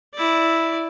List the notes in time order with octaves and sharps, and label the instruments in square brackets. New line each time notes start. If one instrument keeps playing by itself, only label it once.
[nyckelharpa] E4 D5